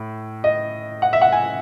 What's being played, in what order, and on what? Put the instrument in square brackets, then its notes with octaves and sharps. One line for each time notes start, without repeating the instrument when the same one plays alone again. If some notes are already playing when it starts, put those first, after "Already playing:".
Already playing: [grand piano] A2
D#5
F#5
E5
F#5
G#5